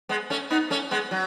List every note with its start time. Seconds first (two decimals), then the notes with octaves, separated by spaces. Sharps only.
0.09 G#3 B3
0.30 A3 C#4
0.50 B3 D#4
0.70 A3 C#4
0.91 G#3 B3
1.11 F#3